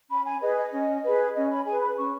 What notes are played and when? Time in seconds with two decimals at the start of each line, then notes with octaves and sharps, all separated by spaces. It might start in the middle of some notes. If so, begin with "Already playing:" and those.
0.10 C#4 B5
0.25 G#5
0.41 G#4 B4 D#5
0.57 D#5
0.72 C#4
1.03 G#4 B4
1.34 C#4 D#5
1.50 B5
1.66 G#4 B4 G#5
1.81 B5
1.97 C#4 C#6